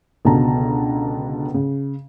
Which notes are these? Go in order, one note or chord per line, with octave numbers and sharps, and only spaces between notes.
C#2 B2 D3 A5 A#5
C#3